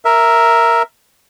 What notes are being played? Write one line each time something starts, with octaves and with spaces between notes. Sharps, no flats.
A#4 E5